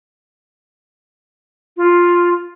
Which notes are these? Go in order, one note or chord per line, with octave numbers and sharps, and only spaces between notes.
F4